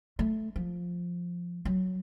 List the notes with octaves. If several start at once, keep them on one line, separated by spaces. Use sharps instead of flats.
A3
F3
F#3